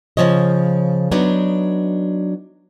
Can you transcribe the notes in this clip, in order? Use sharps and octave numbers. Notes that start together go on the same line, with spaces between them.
C#3 E3 F3 C#5 D#5
F#3 B3 D4 D#4